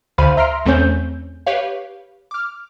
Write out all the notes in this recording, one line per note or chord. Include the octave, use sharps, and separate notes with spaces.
D2 C5 F5 B5 D#7
E5 A#5 C6 F6 C7 D7
E2 A3 C4 C#4 G6
G4 B4 C#5 F5
D6 F6